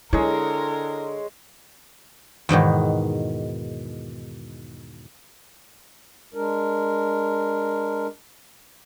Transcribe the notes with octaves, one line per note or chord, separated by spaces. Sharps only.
D3 G#3 E4 A#4 C#5
E2 G#2 B2 D#3
G#3 D4 A#4